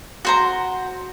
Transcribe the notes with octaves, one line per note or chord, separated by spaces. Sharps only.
F#4 C5 A#5